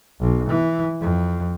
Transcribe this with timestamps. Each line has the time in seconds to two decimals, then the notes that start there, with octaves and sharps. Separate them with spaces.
0.20 B1
0.50 E3
1.01 F2